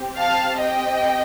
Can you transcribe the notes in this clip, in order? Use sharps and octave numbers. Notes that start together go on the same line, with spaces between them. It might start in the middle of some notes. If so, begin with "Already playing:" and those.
Already playing: C4 G4
F5 A5
D#5 G5